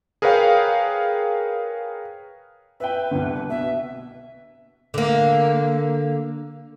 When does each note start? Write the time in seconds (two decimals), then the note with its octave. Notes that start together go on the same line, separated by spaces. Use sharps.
0.22 G#4 A#4 B4 C#5 F5 G5
2.80 B4 E5 G5
3.11 C2 D3
3.49 B2 E5
4.94 D3 A#3